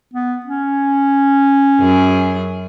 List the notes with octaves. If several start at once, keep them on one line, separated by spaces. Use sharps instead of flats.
B3
C#4
F#2 G#4